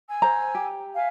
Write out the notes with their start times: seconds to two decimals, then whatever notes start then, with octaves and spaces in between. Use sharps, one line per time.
0.08 G#5 E6
0.22 C5 A#5
0.55 G4
0.95 E5 F5 G#5